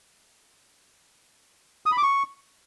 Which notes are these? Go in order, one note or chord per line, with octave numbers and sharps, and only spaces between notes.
D#6
B5
D6
C#6